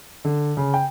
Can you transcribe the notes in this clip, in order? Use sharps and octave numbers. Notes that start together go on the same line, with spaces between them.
D3
C#3
G5